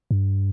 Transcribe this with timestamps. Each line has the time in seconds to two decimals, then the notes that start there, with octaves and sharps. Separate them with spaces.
0.11 G2